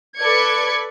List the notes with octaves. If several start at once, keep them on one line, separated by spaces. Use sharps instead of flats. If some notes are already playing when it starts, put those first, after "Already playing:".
A4 B4 D5 G#6 C#7